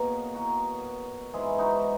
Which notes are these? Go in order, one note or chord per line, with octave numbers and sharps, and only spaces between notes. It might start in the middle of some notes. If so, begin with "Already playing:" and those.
Already playing: B2 A#3 G#4 A#4 C#5
F#4 A#4
G#2 E3 G#3 E4 G#4
D#4 F#4